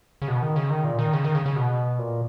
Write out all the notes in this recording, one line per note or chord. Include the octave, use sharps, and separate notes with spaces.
C#3
B2
D#3
C#3
D#3
A#2
D#3
C#3
D#3
C#3
C#3
B2
A#2